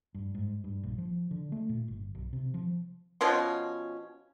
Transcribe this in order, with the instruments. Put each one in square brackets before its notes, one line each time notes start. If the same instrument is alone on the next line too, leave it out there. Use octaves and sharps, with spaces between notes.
[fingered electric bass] G2
G#2
G2
A#1
F3
D3
A3
A#2
G1
B1
C3
F3
[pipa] B2 F3 C#4 C6